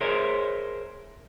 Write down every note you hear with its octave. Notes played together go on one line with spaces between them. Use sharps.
G#4 A#4 C5 C#5 E5